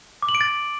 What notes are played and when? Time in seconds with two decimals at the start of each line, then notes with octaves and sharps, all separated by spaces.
0.22 D6
0.29 F#7
0.35 D7
0.41 A6